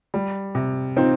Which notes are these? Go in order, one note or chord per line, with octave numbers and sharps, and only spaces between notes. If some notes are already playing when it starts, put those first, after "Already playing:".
G3
C3
C4 D#4 F4